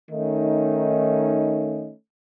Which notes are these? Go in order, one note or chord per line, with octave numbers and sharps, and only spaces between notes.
D#3 A3 C#4 D#4